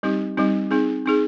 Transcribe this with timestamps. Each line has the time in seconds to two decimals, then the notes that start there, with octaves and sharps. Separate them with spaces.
0.03 G3 C4 D#4 G4
0.37 G3 C4 D#4 G4
0.71 C4 D#4 G#4
1.06 C4 D#4 G#4